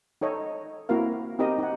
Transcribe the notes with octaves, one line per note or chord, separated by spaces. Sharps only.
D#4 A4 C#5 D#5
A#3 C4 E4 F#4 A#4 F5
C4 D#4 G4 A#4 D#5
D#4 F#5